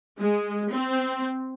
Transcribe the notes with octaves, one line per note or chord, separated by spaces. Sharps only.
G#3
C4